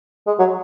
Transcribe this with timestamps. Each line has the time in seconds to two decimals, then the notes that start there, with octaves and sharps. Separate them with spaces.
0.27 G#3
0.39 F#3